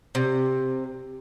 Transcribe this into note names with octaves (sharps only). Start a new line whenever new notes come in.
C3